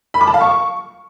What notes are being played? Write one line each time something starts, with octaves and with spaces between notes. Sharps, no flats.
B5
D6
A5
F5
C#6